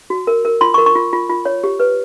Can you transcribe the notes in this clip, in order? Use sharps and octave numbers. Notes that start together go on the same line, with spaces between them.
F#4
A#4
A#4
F4 C6
C#6
A#4
C#6
F4
F4
F4
C#5
G4
B4